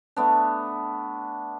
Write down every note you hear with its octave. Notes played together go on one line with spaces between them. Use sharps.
A3 B3 D4